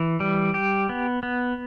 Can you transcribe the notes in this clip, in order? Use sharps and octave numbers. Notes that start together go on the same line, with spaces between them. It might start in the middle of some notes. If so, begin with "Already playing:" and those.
Already playing: E3
G3
G4
B3
B3